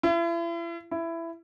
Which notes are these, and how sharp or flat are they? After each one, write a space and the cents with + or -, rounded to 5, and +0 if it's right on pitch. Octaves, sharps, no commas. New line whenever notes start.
E4 +40
E4 +15